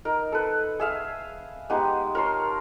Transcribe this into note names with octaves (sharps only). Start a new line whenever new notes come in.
D#4 A#4
A4 B4
G#4 E5 F5
G#3 B3 D#4 G4
A#4 C#5 A5 C6